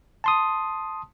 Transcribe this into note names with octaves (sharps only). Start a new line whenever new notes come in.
A5 C6 D#6